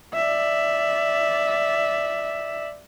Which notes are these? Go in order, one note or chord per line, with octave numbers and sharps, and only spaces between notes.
D5 E5